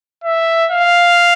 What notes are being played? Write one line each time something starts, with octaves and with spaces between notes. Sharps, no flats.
E5
F5